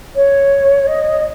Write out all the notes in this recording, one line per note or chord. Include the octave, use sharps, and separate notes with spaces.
C#5
D#5